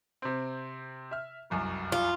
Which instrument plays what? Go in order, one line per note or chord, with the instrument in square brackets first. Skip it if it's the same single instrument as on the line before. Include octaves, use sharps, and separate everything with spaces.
[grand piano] C3 C4
E5 F6
F1 C2 F#2
[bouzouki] F4